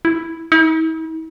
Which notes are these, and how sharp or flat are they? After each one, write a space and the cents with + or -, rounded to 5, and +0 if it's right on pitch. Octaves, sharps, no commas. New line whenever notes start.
E4 +0
E4 -45